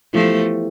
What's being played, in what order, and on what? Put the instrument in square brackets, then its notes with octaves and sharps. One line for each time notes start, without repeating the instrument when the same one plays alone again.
[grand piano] E3 B3 E4 G4 C5 [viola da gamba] F3 A3